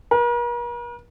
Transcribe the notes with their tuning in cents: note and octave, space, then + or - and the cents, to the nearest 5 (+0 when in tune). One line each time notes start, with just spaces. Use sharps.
A#4 +45